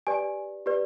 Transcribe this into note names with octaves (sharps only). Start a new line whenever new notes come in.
G4 B4 D5 G#5
G4 B4 D5